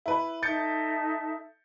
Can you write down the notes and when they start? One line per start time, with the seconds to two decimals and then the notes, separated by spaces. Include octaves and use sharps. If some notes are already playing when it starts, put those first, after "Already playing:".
0.06 E4 B4
0.43 D#4 A4 E5 G6 A6 C#7